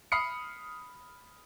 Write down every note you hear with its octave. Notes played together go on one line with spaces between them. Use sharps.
B5 D#6 F6 C7 C#7